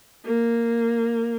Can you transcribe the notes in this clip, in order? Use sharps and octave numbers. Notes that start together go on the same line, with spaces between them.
A#3